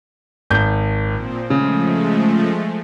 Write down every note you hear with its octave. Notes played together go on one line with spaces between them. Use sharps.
G#1 G6
A#2 F3 C4
C#3 F3 G#3 A3